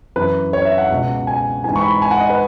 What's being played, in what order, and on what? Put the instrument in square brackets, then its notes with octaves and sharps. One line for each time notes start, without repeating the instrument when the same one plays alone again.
[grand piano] F#2 E3 B4
C#5
E5
F#5
C#2 B2
G#5
G#2 E3 G#5
C#6
B5
G#5
F#5
D#5
B4